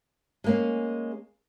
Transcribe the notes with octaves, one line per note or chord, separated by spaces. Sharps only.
G#3 A#3 C#4